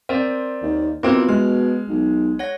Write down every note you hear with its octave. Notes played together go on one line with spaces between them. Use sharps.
C4 A#4 C5 D5
D#2
B2 A#3 C4 E4 F4
G#3 F6
B1
C#5 F#5 A#6